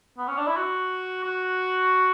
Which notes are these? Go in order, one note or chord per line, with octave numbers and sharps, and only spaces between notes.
B3
C#4
D4
E4
F#4
F#4